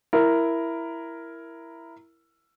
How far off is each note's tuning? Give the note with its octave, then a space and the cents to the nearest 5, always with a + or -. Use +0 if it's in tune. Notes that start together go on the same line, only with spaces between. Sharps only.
E4 +10 A#4 +0